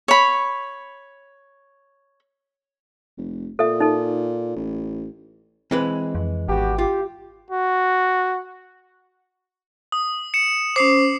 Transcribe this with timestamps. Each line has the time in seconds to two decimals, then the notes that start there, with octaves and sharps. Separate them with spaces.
0.08 C#5 B5
3.18 F1
3.59 A#2 A4 E5
3.80 D#4 A4
4.56 A1
5.71 E3 G#3 C4 B4
6.15 F2
6.48 G#1 B3 F#4 G4
6.78 F4 G4
7.51 F#4
9.92 D#6
10.34 C#7 E7
10.76 C#4 C5 D6 C7